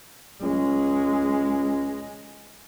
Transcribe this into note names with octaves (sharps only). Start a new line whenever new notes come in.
C#2 G#3